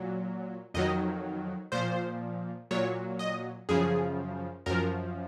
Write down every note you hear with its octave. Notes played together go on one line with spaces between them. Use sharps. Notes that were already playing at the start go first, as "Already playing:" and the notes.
Already playing: A#2 F#3
F2 D#3 F#3 D#5
A#2 F3 C5
A#2 F#3 C#5
D#5
F#2 C#3 F3 G#4
F#2 F3 A#4